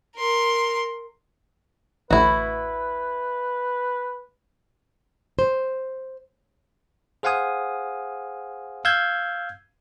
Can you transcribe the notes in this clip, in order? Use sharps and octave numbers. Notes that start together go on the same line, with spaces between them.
A#4 C6
A1 D2 A2 E4 F#4 B4
C5
G#4 C5 F5 F#5 G#5 D#6
F5 E6 G6 G#6